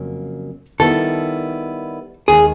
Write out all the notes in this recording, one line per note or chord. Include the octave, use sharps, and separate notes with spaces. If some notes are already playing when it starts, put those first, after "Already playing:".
Already playing: F2 C#3 F#3 A#3
D#3 G3 B3 E4 A4
D#2 D#3 G#3 G#4